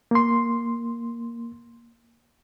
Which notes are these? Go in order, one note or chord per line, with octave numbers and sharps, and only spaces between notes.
A#3 C6